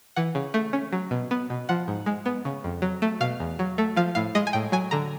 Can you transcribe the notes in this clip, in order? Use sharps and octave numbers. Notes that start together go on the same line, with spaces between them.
E3 F#5
C#3
A3
C#4
F#3
B2
B3
B2
F3 F#5
G#2
G#3
B3
C#3
F2
F#3
A3
B2 F5
E2
F#3
A3
F3 F5
A2 F5
G#3 D#5
G#5
A2 G5
F#3 G#5
D3 A#5